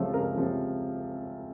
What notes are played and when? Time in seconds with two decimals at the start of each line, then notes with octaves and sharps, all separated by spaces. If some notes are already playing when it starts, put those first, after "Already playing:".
Already playing: C#2 C3 F3 A3 C#5
0.14 C#2 A#4
0.36 C3 F3 A3